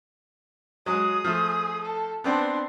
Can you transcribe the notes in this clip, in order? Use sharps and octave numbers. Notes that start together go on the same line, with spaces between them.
F#3 G#3 G#4 D#6
F3 A3
A4
B3 C4 D4 D5 C6